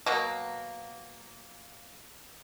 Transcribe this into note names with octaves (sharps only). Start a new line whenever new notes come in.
B2 F#3 A#3